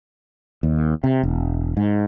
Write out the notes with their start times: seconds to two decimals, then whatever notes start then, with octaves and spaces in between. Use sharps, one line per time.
0.63 D#2
1.04 C3
1.23 E1
1.77 G#2